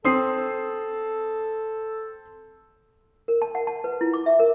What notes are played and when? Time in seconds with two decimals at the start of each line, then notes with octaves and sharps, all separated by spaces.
0.05 C4 A4 D#6 C7
3.28 A#4
3.42 A5
3.55 F#5
3.67 A5
3.84 B4
4.01 E4
4.14 D6
4.26 E5
4.39 A#4